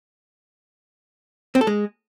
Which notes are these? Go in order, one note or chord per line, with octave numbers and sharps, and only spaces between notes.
C4
A4
G#3